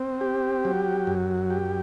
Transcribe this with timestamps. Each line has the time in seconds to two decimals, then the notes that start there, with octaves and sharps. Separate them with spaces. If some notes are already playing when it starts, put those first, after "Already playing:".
Already playing: C4
0.21 G4
0.65 F#3
1.07 F#2
1.50 G4